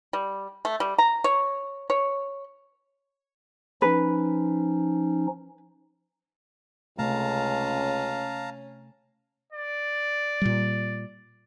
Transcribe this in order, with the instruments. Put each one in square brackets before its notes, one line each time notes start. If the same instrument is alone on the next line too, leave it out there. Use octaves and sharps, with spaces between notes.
[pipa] G3
A3
G3
A#5
C#5
C#5
[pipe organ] F3 C#4 D#4 [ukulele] B4
[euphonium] C#2 [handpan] C3 A3 [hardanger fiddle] C#4 [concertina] F5 A5 A#5
[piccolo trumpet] D5
[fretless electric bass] A#2 G3